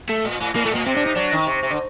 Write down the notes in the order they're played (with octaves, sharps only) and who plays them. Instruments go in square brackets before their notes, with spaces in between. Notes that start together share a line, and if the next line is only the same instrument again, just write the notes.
[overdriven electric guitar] A3
[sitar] A#2
A2
[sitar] A2 [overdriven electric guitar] A#3
[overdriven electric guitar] A3
[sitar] A#2 [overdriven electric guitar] A#3
[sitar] C3 [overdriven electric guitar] C4
[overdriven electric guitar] D4
D#4
[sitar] F#3 [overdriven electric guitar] D4
[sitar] D#3
C3
C3
D3